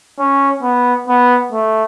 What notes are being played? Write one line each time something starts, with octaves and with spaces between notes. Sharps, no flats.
C#4
B3
B3
A3